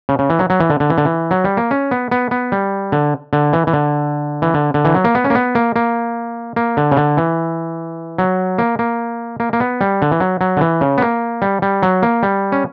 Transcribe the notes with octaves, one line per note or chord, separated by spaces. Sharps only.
C#3
C#3
E3
F#3
F#3
E3
D3
D3
E3
D3
E3
F#3
G3
A#3
C#4
B3
B3
B3
G3
D3
D3
E3
E3
D3
E3
D3
D3
E3
F#3
A#3
B3
C#4
A#3
B3
A#3
A#3
A#3
D3
C#3
D3
E3
F#3
A#3
A#3
A#3
A#3
B3
G3
D3
E3
F#3
F#3
D3
E3
C#3
B3
A#3
G3
G3
F#3
A#3
G3
C#4